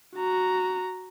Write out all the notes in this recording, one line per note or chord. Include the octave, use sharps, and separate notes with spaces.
F#4 A#5